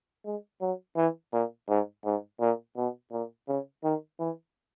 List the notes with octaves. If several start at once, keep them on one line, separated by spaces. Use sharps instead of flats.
G#3
F#3
E3
A#2
G#2
G#2
A#2
B2
A#2
C#3
D#3
E3